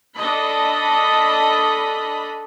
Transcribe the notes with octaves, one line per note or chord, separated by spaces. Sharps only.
D4 A4 D#5 B5